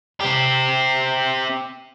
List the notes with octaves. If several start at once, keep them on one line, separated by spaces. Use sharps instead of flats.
C4 G4